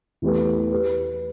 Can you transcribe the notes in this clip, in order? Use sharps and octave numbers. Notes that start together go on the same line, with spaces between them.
E2 E3 A3 G4 B4
G4 B4